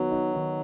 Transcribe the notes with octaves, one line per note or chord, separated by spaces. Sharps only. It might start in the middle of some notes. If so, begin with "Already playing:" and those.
Already playing: D#3 F#3 B3 D#4 F#4
D#4
D#3